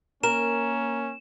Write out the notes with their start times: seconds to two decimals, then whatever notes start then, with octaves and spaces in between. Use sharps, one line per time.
0.23 A#3 C#4 A#4 E7